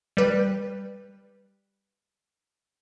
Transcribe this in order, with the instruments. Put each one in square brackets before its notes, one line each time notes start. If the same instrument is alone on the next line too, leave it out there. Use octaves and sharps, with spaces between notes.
[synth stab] G3 B4